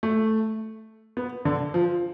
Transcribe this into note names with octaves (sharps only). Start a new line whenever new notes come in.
A3
B3
D3
F3